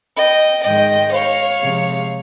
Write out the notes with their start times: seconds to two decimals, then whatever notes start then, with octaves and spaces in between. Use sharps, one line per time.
0.17 D#5 G5
0.64 G#2 D#3 G#3 D#5 G5
1.13 C#5 F5
1.60 C3 F3 G#3